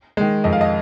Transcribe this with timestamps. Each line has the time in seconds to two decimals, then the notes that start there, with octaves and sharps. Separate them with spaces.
0.17 D#3 G#3
0.44 F2 D#5
0.53 F5
0.61 D#5